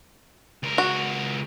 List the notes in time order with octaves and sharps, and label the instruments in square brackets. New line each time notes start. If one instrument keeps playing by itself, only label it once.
[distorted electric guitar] C#2 A#4
[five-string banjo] F#4